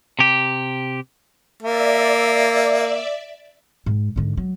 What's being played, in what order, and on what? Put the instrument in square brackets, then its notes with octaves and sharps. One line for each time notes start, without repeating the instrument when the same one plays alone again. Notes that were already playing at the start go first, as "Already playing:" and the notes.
[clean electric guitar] C3 G4
[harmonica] A#3 [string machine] D5 E5
[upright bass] G#2
G#2 D3
F#3